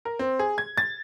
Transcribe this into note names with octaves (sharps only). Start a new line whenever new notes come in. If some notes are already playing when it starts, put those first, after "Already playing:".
A#4
C4
G#4
G#6
A6